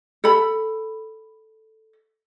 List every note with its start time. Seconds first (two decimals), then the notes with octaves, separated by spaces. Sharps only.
0.24 A4 B5